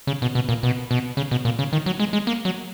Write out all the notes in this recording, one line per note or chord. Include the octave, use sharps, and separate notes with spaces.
C#3
B2
B2
A#2
B2
B2
C#3
B2
A#2
C#3
D#3
F#3
G#3
G#3
A#3
F#3